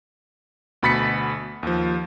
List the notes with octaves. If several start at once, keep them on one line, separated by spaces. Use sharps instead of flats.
D2 B2 B5 A6 B6 C#7
D#2 F3